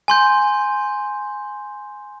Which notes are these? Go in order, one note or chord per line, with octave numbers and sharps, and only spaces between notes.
G#5 C6 G6